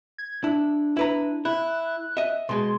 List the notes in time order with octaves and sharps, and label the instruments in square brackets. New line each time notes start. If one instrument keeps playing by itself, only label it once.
[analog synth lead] G#6
[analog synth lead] D4 [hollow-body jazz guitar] E4
[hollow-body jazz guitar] E4 B4 A#5
[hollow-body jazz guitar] E4 [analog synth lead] F#6
[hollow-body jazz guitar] D#5 E5
[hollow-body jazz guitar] B2 G#3 [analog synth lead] C6